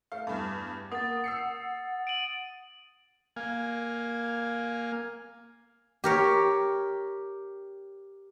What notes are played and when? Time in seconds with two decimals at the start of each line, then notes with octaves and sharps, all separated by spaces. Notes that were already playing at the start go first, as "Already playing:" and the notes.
0.12 A3 F5
0.27 E2 G2
0.92 A#3 F#5 D#6 A6
1.24 E6 C7 C#7
2.07 D7 D#7 F#7
3.36 A#3 F5 G#5
6.04 G4 A#4 C#5